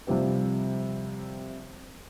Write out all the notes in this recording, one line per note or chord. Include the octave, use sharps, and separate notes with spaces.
C3 F3 G3 C4